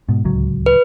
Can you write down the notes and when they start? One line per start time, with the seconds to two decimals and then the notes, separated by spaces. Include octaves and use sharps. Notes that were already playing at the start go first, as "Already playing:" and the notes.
0.09 G#2 B2
0.25 D1 C#2 F#3
0.66 B4